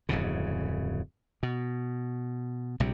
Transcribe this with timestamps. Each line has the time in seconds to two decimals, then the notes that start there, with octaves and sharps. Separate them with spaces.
0.09 D1 F2 G#2 C#3
1.43 B2
2.80 A#1 C3 G3